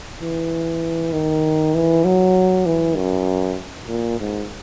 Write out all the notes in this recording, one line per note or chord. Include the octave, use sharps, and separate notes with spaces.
E3
D#3
E3
F#3
E3
F#2
A#2
G#2